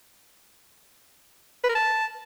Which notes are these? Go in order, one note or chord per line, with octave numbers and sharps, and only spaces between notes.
B4
A#4
A5